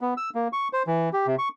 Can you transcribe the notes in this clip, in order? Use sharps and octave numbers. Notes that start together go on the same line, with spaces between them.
B3
E6
A#3
C#6
C5
E3
G4
C3
C#6